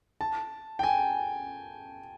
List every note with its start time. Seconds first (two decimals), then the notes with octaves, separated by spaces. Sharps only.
0.21 A5
0.79 G5
0.83 G#5